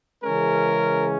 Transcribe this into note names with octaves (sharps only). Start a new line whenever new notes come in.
C#3 E3 G#3 C#4 A#4